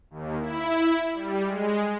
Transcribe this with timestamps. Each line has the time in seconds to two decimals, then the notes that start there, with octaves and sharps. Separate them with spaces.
0.11 D#2
0.40 E4
1.13 G3
1.44 G#3